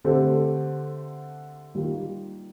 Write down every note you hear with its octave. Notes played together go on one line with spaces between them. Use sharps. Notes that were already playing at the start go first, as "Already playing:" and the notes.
D3 A3 C4 G4
D#3 G3 A#3 F4